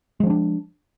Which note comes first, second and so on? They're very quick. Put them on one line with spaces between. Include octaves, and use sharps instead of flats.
G#3 F3 C#4 D4